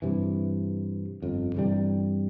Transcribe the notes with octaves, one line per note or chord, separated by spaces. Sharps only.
G2 C3 E3
G1 F2
G2 C3 E3 G3